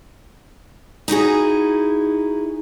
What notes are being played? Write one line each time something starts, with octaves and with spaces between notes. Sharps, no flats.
D#4 E4 F#4 G#4